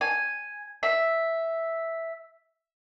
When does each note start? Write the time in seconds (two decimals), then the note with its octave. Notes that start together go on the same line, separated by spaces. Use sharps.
0.01 G#5
0.83 E5